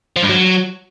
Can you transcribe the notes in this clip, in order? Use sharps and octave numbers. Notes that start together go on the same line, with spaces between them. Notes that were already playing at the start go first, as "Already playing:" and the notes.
F3
G2
F#3